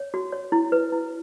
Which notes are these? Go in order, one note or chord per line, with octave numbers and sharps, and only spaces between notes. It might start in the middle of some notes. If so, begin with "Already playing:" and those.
Already playing: C#5
F#4
C#5
E4
B4
E4